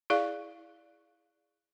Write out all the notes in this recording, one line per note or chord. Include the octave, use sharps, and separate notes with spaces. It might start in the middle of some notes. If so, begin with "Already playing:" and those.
E4 G#4 D5 F5